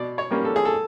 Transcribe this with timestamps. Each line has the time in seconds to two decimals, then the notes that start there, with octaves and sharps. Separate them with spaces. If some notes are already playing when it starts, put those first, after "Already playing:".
Already playing: B2 D5
0.18 C#5
0.31 G3 A#3 C#4
0.45 A4
0.56 G#4
0.65 A4